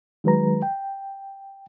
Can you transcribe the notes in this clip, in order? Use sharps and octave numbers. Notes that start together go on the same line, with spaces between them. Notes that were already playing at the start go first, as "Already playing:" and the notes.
D#3 F#3 G#3 B4 A#5
G5